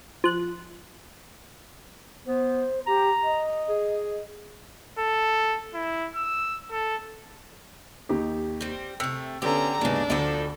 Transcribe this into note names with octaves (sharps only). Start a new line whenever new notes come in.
F3 F#6
B3 C5
G4 A#5
D#5
G#4
A4
E4
E6
A4
D#2 D#4 G4
G3 C4
C3 A3 E6
D3 B3 C#4 G4 A#5
D#2 G#2 C#3 A#3 B3 D4
D2 F3 D#4 A4